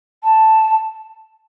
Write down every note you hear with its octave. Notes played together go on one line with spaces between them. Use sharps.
A5